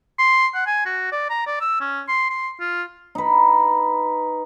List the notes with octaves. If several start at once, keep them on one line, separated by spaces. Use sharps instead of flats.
C6
F#5
G#5
F#4
D5
A#5
D5
E6
C#4
C6
C6
F4
D#4 B4